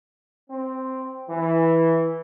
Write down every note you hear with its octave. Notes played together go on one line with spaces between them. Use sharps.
C4
E3